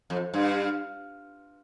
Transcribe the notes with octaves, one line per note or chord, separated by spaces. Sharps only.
F2
G2